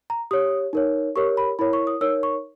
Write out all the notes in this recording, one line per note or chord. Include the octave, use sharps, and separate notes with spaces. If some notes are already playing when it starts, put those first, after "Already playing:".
A#5
G4 C#5 D#6
D#4 A#4 C#5
G4 A#4 C#5 C#6
B5
E4 A#4 C#5 B5
C#6
D#6
D#4 A#4 C#5 E6
C#6